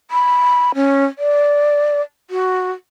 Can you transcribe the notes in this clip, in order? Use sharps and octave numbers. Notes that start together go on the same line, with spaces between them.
B5
C#4
D5
F#4